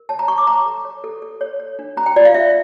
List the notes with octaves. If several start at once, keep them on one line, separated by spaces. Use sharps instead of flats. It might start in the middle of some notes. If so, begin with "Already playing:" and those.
Already playing: A#4
C#5 A5
A#5
C#5 C#6
D6
C#5 A#5
A4
C#5
A4
A4
C#5
C#5
D4
C#4 A#5
G5
F4 D5
F5
C#4 E5